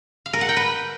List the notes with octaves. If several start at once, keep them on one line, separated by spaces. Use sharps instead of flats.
F5
A#4
F#5
G5
B4